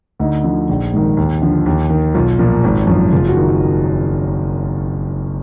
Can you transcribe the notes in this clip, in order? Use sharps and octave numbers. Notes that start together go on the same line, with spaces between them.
D2 D#4
D3 F3
A#1
G#2 D#3
D#2
D3 F3
D#2
D#3
B1 F4
A#2 F3
G#1
F#2 F3
F#1 F4
F#4
D#3